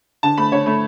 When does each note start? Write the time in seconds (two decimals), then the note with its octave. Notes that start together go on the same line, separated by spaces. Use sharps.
0.23 D3 A5
0.38 A3 B5
0.52 D3 C#5
0.66 A3